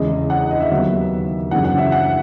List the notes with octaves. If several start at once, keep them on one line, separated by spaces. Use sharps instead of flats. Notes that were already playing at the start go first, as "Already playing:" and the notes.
Already playing: E2 C#3 G#3 C#4 E4 D#5
F#5
D#5
E5
D#2 D#3 F#3 B3
F#2 C#3 E3 F#5
F#5
E5
F#5